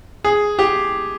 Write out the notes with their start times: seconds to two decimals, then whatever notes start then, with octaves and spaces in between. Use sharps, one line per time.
0.24 G#4
0.59 G4